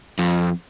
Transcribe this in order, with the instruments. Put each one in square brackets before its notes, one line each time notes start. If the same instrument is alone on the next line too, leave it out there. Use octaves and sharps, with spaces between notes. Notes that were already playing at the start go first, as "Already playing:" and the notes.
[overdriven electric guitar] F2